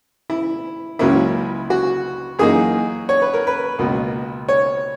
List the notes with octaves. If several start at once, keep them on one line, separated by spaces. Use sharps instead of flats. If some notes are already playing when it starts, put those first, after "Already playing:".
E4
C#2 C#3 F#3 A#3 C#4 E4
F#4
F#2 E3 A#3 D#4 G#4
C#5
B4
A#4
B4
C#2 B2 A#3
C#5